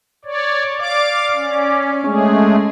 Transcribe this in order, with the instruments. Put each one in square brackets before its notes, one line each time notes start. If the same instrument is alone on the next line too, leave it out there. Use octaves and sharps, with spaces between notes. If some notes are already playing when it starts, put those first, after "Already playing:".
[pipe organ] C#5 D5
[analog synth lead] D5 [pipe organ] F5 D6
[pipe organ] C#4
[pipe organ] G#3 A3 G#4 [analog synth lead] C#4